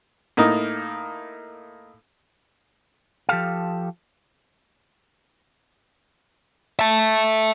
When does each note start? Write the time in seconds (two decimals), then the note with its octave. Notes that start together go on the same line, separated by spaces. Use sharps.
0.37 A2 A#3 D#4
3.29 F3 G4 A4 F5
6.79 E5 A5